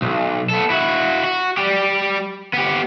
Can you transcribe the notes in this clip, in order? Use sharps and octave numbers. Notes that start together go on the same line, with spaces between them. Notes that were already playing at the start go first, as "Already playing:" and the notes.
B1
B3 A4
E4 F#4
F#4
G3 G4
B3 G4